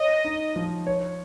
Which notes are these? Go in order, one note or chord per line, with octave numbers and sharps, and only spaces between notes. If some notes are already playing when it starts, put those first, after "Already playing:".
Already playing: C#5 D#5
D#4
F3
C#5